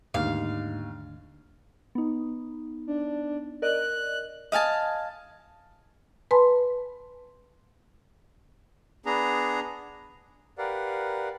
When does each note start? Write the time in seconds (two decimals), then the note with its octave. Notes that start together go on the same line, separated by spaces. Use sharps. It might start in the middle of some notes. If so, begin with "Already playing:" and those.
0.14 D#2 G#2 D3 A3 D4 F5
1.95 B3 D#4
2.87 D4
3.62 A#4 D5 D#5 F#6
4.52 D#5 F5 G#5 A5
6.31 B4 G#5 A5 B5 C6
9.06 B3 D4 G#4 A#5
10.58 G4 A#4 B4 D5 F5 F#5